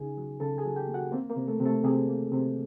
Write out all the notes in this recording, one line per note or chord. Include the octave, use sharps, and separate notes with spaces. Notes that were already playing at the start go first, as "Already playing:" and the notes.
Already playing: C#3 D#4 G#4 G#5
F#3
C#3 A4 A5
G#4 G#5
F#3
G4 G5
A#3
F#4 F#5
A#3 C4 C5
A#3 A#4
C3
A3 A4
C3
A3 A4
C3 G#4
A#3
C3